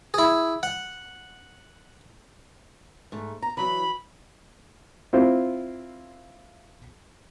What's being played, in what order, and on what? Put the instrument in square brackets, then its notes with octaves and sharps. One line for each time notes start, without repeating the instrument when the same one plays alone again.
[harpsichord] E4 G#4
F#5
[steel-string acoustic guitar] G#2 A3
A#5
[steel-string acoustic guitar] E3 F#3 [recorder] B5
[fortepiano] C4 E4 F4 C5